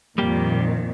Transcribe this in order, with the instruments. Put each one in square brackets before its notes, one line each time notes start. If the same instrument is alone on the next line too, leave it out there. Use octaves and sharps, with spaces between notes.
[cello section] F2 A#2 D#3 [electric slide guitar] G3 A#3 G4